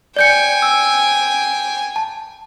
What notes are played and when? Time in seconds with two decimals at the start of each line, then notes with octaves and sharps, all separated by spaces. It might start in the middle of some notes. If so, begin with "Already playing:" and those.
0.17 D5 G5 G#5 G6 C#7
0.62 E6
1.96 A5